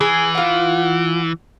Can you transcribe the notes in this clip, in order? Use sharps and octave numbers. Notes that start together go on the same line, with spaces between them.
E3 G#4
F4 F#5